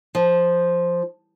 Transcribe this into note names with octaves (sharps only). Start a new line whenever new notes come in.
F3